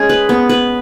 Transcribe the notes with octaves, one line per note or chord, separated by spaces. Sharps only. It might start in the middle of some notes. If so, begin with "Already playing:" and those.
Already playing: G#3 C#4 G#4
B4
B3
B4